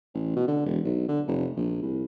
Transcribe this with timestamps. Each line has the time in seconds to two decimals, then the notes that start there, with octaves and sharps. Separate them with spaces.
0.14 A1
0.36 B2
0.47 D3
0.65 E1
0.84 B1
1.08 D3
1.27 F1
1.56 A#1
1.82 C2